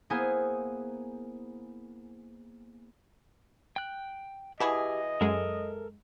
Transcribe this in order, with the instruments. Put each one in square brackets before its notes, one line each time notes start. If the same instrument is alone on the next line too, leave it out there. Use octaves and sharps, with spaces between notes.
[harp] A#3 B3 E4 G#4 C5 G#5
[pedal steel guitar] G5 F#6
[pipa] B2 E3 G#4 [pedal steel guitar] G4 [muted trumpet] D#5
[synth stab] F#2 G#3 [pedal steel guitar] A4 A#4